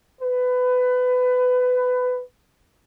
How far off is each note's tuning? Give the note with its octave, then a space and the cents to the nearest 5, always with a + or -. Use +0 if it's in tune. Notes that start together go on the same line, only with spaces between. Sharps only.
B4 +20